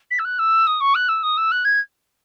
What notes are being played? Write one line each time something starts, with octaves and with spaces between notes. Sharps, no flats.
B6
E6
F#6
E6
D#6
C#6
F#6
E6
D#6
E6
F#6
G#6